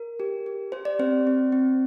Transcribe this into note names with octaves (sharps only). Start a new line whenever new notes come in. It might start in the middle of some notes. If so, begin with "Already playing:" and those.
Already playing: A#4
G4
G4
G4 C5
D5
C4 C5
C4
C4